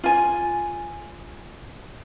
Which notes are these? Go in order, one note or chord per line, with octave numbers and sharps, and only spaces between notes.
F4 G#5